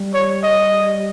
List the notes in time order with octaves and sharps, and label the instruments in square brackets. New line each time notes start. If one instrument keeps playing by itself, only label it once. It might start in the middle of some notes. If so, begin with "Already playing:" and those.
Already playing: [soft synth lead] G3
[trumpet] C#5
D#5